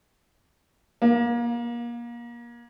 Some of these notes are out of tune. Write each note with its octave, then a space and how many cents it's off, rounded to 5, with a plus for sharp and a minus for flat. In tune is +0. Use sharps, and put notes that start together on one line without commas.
A#3 +30